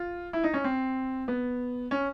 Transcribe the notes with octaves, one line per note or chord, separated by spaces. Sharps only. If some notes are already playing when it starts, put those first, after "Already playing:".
Already playing: F4
E4
D#4
C#4
C4
B3
C#4